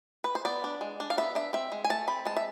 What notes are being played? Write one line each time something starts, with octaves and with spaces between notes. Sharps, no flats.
B4
C5
B3 D5
D4
G#3
D4
F5
B3 E5
D4 E5
C4 E5
G#3
G#5
A3 A5
C4 B5
G#3 A5
E5